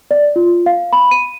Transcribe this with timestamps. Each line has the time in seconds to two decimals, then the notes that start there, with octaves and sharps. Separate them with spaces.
0.11 D5
0.36 F4
0.66 F5
0.93 B5
1.11 D#7